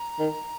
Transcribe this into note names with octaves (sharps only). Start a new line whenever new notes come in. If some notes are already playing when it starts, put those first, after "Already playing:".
Already playing: A#5
D#3